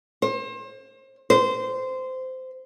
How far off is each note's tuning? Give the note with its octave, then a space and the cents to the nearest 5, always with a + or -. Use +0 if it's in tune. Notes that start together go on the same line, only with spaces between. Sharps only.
C5 +35
C5 -15